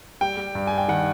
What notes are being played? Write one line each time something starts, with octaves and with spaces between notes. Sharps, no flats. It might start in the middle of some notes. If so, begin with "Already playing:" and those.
G3 G5
G3
G2
G3 G#5
G5
D#3 F#5